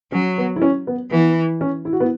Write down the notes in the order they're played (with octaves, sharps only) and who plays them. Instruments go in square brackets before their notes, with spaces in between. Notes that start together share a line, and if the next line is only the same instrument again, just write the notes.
[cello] F#3 [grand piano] C#4
[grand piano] B3
E4
C#4
B3
[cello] E3 [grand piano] B3
[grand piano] C#4
E4
F#4
B3 E4